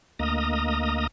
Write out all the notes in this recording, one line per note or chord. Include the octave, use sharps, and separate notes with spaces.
D2 A#3 D#5 A#5 D#6